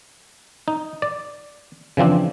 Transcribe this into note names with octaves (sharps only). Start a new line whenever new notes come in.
D#4
D5
C#3 E3 F3 C4 D4